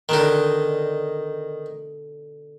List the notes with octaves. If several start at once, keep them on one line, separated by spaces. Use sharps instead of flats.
B2 D3 D#3 D#4 D5